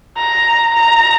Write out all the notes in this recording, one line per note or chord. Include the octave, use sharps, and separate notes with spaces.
A#5
A#5